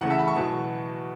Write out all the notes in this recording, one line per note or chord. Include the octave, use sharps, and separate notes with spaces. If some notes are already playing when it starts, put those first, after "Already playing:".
E2 C#3 A3 C#4 F#5
E5 A5
F#5 B5
A5 C#6
E2 B2 F#3 B3